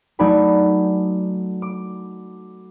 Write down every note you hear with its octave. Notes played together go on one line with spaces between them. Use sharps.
F#3 A3 D#4 D5 G#5 B5
D6